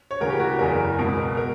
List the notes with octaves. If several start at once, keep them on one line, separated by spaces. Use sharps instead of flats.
C#5
D2 C#3 E3 A#4
G4
F#4
G4
F#1 E2 C#3 E3 A#4
C#2 B2 A#4
A#4